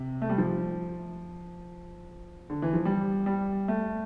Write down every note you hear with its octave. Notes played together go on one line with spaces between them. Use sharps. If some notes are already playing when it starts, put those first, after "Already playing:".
Already playing: C3
A3
G3
F3
D3
E3
F3
G3
G3
A3